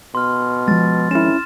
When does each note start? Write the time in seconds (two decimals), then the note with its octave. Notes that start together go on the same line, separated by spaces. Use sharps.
0.15 B2 C6 F6
0.68 F3 G#3 A6
1.11 G#1 C#4 E4 F6 E7